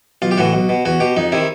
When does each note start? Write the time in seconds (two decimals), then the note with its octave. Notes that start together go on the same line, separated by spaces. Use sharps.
0.22 B1 F4
0.31 G4
0.38 A2 E3 F#4
0.53 B1
0.69 B2
0.85 E2 F#4
1.00 B2 G4
1.16 F2 D#4
1.32 C3 D#3 E4